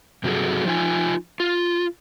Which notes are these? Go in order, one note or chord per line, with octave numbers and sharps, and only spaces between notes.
G2 C3 F#3 F#4 G#4 A4
F3 D#4 F4 G#5
F4